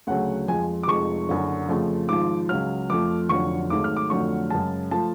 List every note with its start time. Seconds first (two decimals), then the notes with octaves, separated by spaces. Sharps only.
0.07 D2 C#3 F#3 A3 F#5
0.48 F2 F3 G#3 G#5
0.83 D6
0.88 F1 F2 F3 G#3 C#6
1.29 F#1 F#2 D3
1.68 F2 C#3 F3 A3
2.09 G#1 G#2 F3 D6
2.49 C#2 C#3 F#3 F6
2.90 F2 F3 A3 D6
3.29 F1 F2 D3 F#3 C#6
3.70 G#1 G#2 F#3 A3 D6
3.84 F6
3.97 D6
4.10 F2 D3 F#3 A3 C#6
4.50 F#2 C#3 G#3 A5
4.91 F3 A3 A5